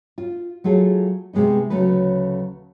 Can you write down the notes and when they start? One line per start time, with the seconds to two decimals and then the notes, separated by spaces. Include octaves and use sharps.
0.18 F4
0.64 F#3 A3 F4 G#4 A4
1.33 C3 G#3 B3 D#4
1.70 D2 C#3 F#3 A3 B4